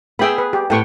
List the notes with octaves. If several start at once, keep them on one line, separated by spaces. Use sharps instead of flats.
B3 G#4 E5 G5 B5
B4
G4
A2 B3 F#5 G5 C#6